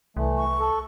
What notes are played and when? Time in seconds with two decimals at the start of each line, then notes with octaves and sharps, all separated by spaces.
0.17 C2 E3 A3
0.38 C#6
0.60 A4